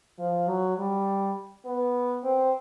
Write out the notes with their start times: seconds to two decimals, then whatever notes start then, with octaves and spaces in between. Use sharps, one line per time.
0.19 F3
0.48 F#3
0.78 G3
1.65 B3
2.24 C4